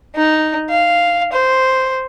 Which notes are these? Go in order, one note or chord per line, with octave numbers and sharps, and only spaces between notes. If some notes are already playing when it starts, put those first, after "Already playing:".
D#4
F5
C5